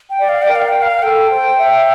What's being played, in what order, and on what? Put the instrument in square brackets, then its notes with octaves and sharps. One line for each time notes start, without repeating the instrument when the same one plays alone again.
[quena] G5
[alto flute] D5
[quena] F5
G5
[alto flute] A#4
[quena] F5
G5
F5
[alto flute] A4 [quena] G5
[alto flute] C5
E5